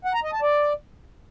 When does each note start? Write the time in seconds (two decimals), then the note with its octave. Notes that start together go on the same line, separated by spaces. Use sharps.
0.05 F#5
0.14 A#5
0.23 D#5
0.33 A5
0.42 D5